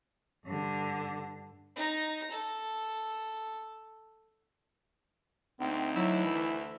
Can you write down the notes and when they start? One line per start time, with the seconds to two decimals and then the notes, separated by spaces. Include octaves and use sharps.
0.45 G2 D3
1.76 D#4 A#5
2.31 A4
5.60 D2 C4 D#4
5.96 F#3 E4
6.25 E3